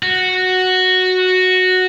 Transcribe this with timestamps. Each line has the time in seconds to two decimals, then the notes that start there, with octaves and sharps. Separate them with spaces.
0.03 F#4